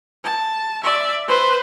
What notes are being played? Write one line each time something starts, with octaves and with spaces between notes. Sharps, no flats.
A5
D5 E5
B4 C5